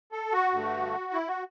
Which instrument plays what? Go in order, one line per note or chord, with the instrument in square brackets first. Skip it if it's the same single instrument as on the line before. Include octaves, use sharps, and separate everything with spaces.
[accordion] A4
F#4
G2 D3 A3
E4
F#4